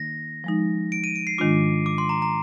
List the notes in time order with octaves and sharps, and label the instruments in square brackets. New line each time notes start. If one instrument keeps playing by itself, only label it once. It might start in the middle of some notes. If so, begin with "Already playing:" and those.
Already playing: [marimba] D#3 A#3 D#4 [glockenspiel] A#6
[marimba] F3 G#3 D#4
[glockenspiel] D7
D#7
D7
C7
[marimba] G#2 D#3 G#3 D4 F4 [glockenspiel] D6
[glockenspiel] D6
C6
A#5
A#5